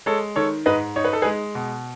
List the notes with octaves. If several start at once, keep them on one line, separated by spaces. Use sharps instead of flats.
G#3 A4 C#5
D#3 A4 C#5
G#2 B4 D#5
D#4 C#5
B4
A4
G#4 B4
G#3
B2